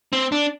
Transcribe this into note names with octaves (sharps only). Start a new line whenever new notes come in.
C4
D4